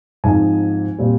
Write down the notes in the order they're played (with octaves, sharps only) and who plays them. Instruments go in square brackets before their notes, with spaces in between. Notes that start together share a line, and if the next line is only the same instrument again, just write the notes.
[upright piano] G#2 F3 C4 D#4 G#5
A#2 G3 C4